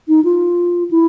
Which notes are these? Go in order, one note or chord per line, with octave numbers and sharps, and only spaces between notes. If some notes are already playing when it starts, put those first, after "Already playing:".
D#4
F4
E4